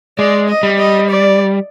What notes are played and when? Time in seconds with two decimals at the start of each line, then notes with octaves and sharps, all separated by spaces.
0.18 G#3 D5
0.49 D#5
0.63 G3
0.78 D#5
1.09 D5